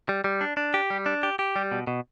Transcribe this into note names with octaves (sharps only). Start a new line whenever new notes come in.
G3
G3
D4
D4
G4
G3
D4
G4
G4
G3
B2
B2